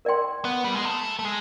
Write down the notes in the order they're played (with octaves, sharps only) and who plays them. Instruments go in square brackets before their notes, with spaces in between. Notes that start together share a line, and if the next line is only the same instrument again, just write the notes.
[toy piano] A#4 D5 G5 C6
[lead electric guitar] B3
G3
G#3
A3
A3
G#3